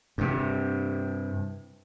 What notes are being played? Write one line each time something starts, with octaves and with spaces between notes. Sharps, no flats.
G2 C3